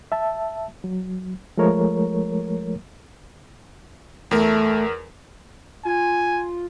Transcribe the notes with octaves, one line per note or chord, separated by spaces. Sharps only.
E5 A5
F#3
F3 G#3 A3 A#4 C#5
E2 A3 A#4
F4 G#5